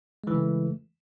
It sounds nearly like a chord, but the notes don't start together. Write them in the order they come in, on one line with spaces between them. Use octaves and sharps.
G#3 E3 C#3 A3